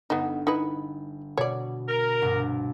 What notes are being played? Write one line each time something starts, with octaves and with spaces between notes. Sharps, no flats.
G1 B3 D#4 E7
D#4 E4 B4
B2 C#5 D5
A#4
C2 G2 B2